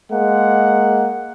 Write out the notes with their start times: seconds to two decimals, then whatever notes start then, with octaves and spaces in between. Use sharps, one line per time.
0.11 G#3 A#3 F#5